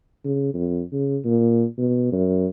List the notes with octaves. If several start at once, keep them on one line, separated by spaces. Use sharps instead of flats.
C#3
F2
C#3
A#2
B2
F#2